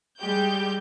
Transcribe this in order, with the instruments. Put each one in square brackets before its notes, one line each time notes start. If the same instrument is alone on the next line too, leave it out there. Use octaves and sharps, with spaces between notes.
[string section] G3 G#3 G4 G6